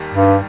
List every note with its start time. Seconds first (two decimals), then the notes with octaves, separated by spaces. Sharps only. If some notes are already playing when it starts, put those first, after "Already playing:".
Already playing: D#2 D#3 G3
0.14 G2